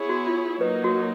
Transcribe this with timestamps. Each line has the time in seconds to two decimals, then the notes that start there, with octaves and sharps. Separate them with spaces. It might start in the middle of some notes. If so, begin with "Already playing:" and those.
Already playing: B3 E4 G#4 C#5
0.09 F#4
0.27 F4
0.61 F#3 A#3 D#4 B4
0.84 F#4